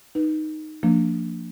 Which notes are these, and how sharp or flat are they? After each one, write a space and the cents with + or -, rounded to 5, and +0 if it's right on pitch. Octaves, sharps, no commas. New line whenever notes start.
D#4 -5 B4 -20
F3 +0 A#3 -25 D4 +0